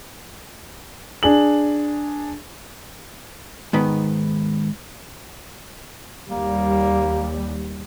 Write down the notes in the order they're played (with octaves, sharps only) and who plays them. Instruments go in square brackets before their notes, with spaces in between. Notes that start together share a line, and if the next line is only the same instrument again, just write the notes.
[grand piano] D4 G#4 F#7
[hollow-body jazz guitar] G#2 D#3 B3
[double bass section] D#2 G3 [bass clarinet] A#3